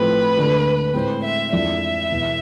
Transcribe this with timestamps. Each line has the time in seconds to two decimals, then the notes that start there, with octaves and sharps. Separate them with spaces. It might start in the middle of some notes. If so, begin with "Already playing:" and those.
Already playing: A2 F3 A3 C4 B4
0.37 D2 D3 G#3
0.94 A2 G#3 C4 C5
1.23 E5
1.52 F2 E3 G#3 D4 E5
2.10 E2 B2 B3 E4